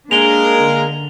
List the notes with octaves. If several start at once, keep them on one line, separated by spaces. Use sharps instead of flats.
G#3 A#3 D4 A#4 F7 G7
D3